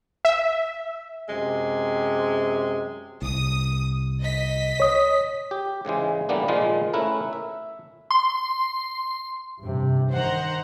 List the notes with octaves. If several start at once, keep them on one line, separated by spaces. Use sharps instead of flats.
E5
F#2 C3 G#3
C2 D#6
D#5 B6
C#5 D#6
G4
G#2 C#3 E3 G#3
D3 E3 G3 A#3 B3 D4
A#2 D#3 F3 G#3
A3 C#4 E4 A#4 B4
E5
C6
G2 C3
D#3 C5 F#5 A#5